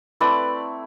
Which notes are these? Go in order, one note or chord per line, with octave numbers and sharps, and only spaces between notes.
A3 C4 E4 B4 D5